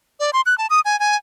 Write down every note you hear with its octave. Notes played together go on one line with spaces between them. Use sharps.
D5
C6
F#6
A5
D#6
G#5
G#5